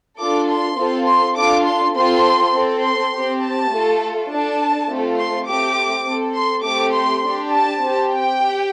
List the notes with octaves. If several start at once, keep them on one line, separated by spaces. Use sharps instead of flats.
D4 F4 A4 D6
C6
C4 F4 A4
C6
D4 F4 A4 D6
C6
C4 F4 A4 C6
C4 A4
C6
C4 G4
A5
A3 F4 A4
D4 A4 A5
A3 C4 F4 A4
C6
A3 C4 G4 D6
C4 A4
C6
A3 C4 G4 D6
C6
D4 G4
A5
C4 G4
G5
G4